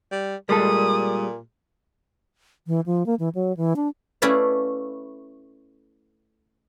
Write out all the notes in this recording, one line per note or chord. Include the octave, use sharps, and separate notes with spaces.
G3
A#2 G3 G#3 A4 D#6
E3
F3
A#3
E3
F#3
E3
D4
A3 C#4 E4 B4 D5 F5